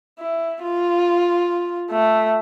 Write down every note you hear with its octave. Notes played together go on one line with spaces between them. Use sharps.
E4
F4
A3